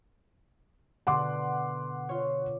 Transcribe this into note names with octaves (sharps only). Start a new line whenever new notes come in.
B2 D3 F#5 C6 D6
F4 C#5